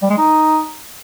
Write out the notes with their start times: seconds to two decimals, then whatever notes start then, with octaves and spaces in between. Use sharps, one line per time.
0.02 G3
0.10 G#3
0.18 D#4